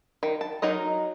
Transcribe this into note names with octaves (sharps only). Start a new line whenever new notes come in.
D#3
A5
F#3 D#4 A#4 D#5